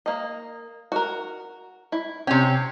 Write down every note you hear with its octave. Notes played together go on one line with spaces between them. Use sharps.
A#3 D#5
F#4 A#4
E4
C3 C#4 G5